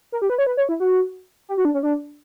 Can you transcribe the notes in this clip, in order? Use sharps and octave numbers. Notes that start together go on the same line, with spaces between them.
A#4
G4
B4
C#5
B4
C#5
E4
F#4
G4
F#4
D4
C#4
D4